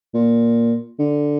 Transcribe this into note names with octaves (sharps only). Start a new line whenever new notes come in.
A#2
D3